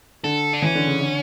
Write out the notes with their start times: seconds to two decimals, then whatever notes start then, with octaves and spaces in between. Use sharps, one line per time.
0.24 D3 A4
0.53 D4
0.62 E3 C#4
0.75 D3
0.87 C#3
1.00 D3